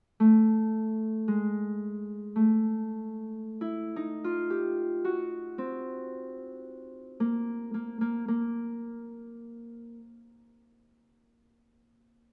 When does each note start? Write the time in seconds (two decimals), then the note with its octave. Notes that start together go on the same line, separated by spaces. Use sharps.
0.20 A3
1.28 G#3
2.36 A3
3.61 E4
3.96 D#4
4.24 F4
4.50 G4
5.05 F#4
5.58 C4
7.20 A#3
7.74 A#3
8.01 A#3
8.28 A#3